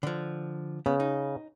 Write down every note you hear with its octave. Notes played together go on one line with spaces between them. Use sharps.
D3 F3
C#3 B3
D#4